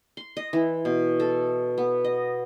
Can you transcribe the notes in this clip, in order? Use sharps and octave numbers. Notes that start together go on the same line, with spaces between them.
C6
D#5
E3
B2
A4
B3
D#5